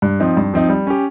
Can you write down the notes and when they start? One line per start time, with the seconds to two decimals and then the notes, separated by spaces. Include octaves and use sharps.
0.02 G2
0.20 F3 C4 D#4
0.37 G2
0.54 F3 C4 D#4
0.69 G3
0.87 C#4 G4